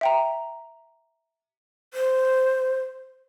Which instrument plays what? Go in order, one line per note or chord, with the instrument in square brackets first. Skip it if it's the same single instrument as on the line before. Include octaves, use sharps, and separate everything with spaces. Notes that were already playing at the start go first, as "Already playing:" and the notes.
[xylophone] E5 G5 A#5
[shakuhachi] C5